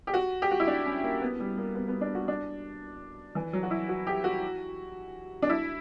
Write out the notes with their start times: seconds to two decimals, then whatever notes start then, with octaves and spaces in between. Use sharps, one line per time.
0.07 G4
0.14 F#4
0.42 G4
0.51 F#4
0.60 E4
0.67 D4
0.85 C#4
1.03 A#3
1.22 B3
1.40 G3
1.57 A#3
1.75 B3
1.88 B3
2.01 D4
2.15 F#4
2.28 D4
3.35 E3
3.53 F#3
3.63 F#4
3.71 E4
3.88 F#4
4.07 G4
4.24 F#4
5.42 D4
5.50 E4